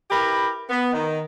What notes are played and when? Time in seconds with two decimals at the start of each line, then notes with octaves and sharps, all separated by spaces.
0.11 E4 G4 A#4 B4
0.70 B3
0.93 D#3